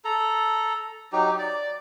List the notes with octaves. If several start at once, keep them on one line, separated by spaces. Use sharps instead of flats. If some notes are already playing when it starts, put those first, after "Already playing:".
A4 A#5
F#3 D#4 G4
D5